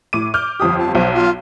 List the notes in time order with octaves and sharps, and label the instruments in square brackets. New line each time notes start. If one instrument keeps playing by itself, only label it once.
[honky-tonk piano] A2 D6 D#7
D6 F6 G6
[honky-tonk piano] G1 F2 G4 [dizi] D#6
[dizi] A5
[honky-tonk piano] B1 [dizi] C5
[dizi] F4